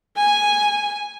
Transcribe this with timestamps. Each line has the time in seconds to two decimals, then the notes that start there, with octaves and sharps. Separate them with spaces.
0.17 G#5